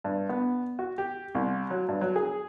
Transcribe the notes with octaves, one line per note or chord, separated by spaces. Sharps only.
G2
B3
F#4
G4
C2
F#3
G2
F#3
G#4